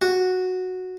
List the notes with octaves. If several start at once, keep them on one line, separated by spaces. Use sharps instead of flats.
F#4